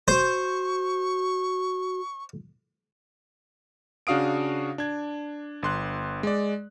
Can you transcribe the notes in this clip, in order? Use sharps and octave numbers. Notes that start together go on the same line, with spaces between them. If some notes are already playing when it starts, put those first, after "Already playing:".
F#4 C5 C#6
C#3 D4 F#4 F5 D#6 D7
D4 G#6
G1 C6 F#6
G#3 D5